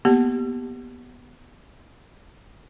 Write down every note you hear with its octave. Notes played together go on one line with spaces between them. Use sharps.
A#3 B3 G4